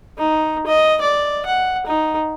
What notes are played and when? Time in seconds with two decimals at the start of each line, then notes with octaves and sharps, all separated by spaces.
0.18 D#4
0.66 D#5
1.01 D5
1.45 F#5
1.86 D#4